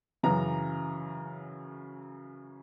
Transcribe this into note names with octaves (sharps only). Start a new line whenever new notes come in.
F#2 C#3 E3 A#5